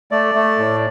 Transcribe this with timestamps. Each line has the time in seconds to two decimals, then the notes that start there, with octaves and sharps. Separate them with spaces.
0.11 A3 D5
0.35 A3
0.58 A2